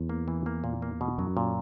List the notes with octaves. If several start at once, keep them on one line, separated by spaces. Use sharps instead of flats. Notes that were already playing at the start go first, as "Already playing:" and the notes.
Already playing: E2
A#3
E3
A#3
A#2
A#3
B2
F#2 F#3
A#2